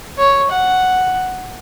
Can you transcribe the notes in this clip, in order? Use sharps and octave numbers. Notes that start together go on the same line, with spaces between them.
C#5
F#5